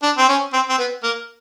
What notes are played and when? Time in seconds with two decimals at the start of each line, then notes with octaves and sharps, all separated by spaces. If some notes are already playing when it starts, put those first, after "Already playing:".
0.03 D4
0.18 C4
0.29 C#4
0.53 C4
0.69 C4
0.78 B3
1.03 A#3